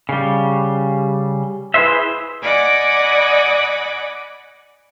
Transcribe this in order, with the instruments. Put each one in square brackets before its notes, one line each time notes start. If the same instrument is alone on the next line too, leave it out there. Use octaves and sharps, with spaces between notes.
[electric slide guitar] C#3 G3
E4 G#4 B4 C5 E5
[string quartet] D5 D#5 F#5 G#5 B5 D6